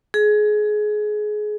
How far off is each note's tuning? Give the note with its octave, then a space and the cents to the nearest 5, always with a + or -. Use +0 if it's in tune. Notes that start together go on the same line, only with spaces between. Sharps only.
G#4 +25